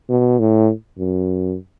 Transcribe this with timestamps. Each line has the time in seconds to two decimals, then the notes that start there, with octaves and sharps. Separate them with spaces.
0.09 B2
0.39 A2
0.99 F#2